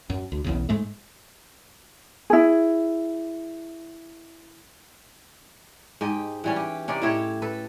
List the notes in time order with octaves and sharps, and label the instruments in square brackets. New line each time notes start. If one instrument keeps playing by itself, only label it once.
[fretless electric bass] F#2
D2
B1 E2 C#3
G#2 G#3 A3
[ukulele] E4 G#4
[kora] G#2 G4 D#5
E3 G3 C#4
G4
C3 C#4 D#4 D5
A2 E4 G4 C#5
A4 B4